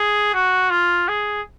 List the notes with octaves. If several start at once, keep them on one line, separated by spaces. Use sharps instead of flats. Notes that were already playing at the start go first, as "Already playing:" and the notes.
Already playing: G#4
F#4
F4
G#4